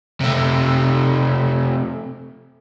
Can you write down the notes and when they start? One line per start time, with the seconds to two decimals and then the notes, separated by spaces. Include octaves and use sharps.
0.20 C3 A3